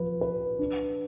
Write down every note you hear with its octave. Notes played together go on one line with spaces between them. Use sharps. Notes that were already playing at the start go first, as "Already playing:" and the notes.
Already playing: F3 B4
B4
D4